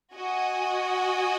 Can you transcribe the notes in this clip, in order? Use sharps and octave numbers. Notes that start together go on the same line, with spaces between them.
F#4 D#5 G#5